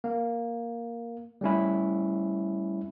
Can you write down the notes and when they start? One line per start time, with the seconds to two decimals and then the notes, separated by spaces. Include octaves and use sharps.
0.04 A#3
1.41 G3 A3 C#4 E4